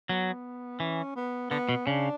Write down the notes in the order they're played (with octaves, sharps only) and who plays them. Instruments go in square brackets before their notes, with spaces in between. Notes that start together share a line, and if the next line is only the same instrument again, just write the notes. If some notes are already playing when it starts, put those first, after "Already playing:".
[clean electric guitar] F#3 [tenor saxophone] B3
[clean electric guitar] E3 [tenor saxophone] C#4
[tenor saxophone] B3
[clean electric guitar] D3 [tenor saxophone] B3
[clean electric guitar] B2
[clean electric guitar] C#3 [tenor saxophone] D4